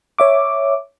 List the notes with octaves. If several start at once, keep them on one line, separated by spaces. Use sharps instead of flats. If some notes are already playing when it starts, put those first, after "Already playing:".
C#5 E5 D6